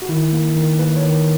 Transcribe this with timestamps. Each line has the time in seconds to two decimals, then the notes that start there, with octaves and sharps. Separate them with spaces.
0.02 F#4
0.09 D#3 E4
0.32 A#3
0.56 D#3
0.79 A#3 B4
0.96 C#5
1.02 D#3